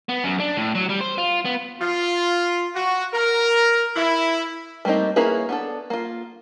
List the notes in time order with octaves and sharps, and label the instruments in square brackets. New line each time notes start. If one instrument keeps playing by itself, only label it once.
[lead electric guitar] B3
F#2
D4
A2
F#3
G3
C5
F4
B3
[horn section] F4
F#4
A#4
E4
[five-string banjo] G3 A3 A#3 C4 D#4
A#3 C#4 E4 G#4 B4
B3 D4 A4
A#3 F4